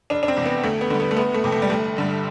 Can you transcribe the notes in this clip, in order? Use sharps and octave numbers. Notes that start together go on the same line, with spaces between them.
F1 D4
D4
C4
E2 C3
B3
D2 A3
B3
D3 G3
B3
A3
G1 B3
A3
F2 C3
A3
G3
G1 A3
G2 D3 G3